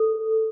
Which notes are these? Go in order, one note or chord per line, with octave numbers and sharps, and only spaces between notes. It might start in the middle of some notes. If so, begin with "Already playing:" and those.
Already playing: A4